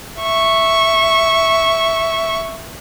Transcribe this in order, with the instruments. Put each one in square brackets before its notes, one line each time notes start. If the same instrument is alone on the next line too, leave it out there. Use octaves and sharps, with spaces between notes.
[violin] E5 C#6